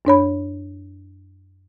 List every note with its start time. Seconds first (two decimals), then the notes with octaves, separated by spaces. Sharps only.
0.05 F#2 D4 C#5 B5